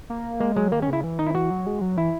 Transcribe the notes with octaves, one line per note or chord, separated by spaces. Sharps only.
A#3
G#3 A#3
F#3 G#3
D#3 A#3
C#4
C#3 E4
E3
D#3 D#4
E4
E3 F#4
F#3
G#3
F#3
E3 E4